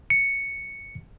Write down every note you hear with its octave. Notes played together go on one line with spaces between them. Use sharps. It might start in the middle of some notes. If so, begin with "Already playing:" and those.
C#7